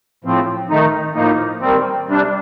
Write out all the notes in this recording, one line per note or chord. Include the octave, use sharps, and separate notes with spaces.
A2 F3 C4
D#3 A3 D#4
A2 F3 A#3 D#4
D#3 G3 C4
C3 G3 D4